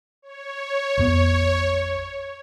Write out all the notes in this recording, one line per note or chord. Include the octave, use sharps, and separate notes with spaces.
C#5
A1 F2 B3